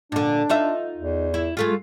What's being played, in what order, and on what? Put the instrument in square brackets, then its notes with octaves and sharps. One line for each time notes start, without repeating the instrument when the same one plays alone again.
[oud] A#2 D3 [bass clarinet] D4
[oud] D#4 F4 E5
[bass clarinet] E2
[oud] E4
G#3 A3 F4